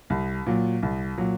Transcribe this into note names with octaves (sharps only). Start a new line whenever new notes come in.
C2
A#2 F#3
C2
A#2 F#3